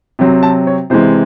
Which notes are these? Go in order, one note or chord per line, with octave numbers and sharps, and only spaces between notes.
C3 F#3 C4
A5
C#5
C3 E3 G#3 C5